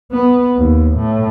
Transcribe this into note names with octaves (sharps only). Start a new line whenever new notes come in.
B3
D#2
A2